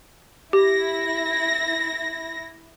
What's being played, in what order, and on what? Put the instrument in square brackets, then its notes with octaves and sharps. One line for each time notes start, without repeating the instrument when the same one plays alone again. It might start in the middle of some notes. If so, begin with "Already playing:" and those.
[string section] E4 A#6 [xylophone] G4